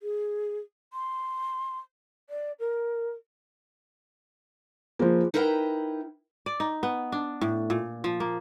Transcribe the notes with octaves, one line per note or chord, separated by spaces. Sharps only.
G#4
C6
D5
A#4
F3 A#3 F4 G#4 C5
D#4 E4 A#4 B4 F#5 G5
D5
D#4
B3
D4
A2
A#2
F3
A#3